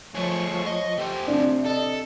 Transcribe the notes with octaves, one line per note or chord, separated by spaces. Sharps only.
F3 A3 G#4 C#5 C#6
D#5
A3 G4 C5
C3 F3 D4
A4 D#5